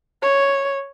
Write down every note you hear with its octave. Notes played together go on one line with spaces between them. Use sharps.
C#5